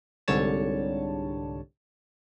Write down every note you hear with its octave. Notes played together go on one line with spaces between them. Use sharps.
C2 G#2 D3 G3 C#5 A5